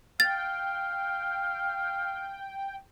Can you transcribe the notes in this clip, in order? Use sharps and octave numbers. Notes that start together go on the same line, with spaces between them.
F5 G5 A6